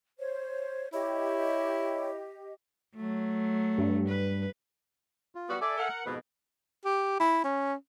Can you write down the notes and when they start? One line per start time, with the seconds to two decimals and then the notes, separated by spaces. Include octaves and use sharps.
0.19 C5 C#5
0.93 E4 G4 C#5 D#5
2.95 F#3 A3
3.78 G2
4.09 B4
5.35 F4
5.50 G3 B3 F#4
5.61 A4 D5 E5 G#5
5.78 A#4 F#5
6.05 F2 G#2 B2 B4
6.85 G4
7.20 E4
7.44 C#4